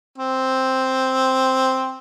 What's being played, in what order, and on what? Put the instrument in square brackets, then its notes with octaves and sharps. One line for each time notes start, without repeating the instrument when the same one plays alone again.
[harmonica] C4